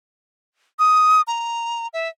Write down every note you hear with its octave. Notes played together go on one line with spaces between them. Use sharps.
D#6
A#5
E5